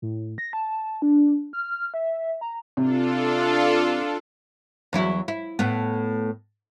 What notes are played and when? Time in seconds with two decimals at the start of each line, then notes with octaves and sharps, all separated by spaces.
0.02 A2
0.38 A#6
0.53 A5
1.02 D4
1.53 F6
1.94 E5
2.41 A#5
2.77 C3 D4 F4 A4
4.93 E2 F#3 E4
5.28 E4
5.59 A2 B3